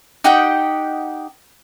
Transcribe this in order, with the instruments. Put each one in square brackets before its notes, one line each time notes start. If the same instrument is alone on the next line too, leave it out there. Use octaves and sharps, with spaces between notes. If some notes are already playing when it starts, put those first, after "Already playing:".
[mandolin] D#4 G4 F#5 G5